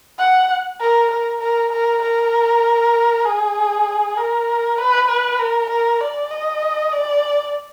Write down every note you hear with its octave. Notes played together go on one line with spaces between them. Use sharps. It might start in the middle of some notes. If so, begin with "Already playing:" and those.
F#5
A#4
A#4
A#4
A#4
A#4
G#4
A#4
B4
B4
A#4
A#4
D5
D#5
D5